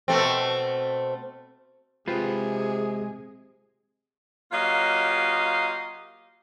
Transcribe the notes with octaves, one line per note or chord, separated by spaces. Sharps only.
B2 A3 C4
C3 G#3 F4 G#4 B4 C5 G5
F#3 A#3 F4 G4 D#5 F5